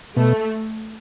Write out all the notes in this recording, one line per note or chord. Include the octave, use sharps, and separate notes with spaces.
B2 A3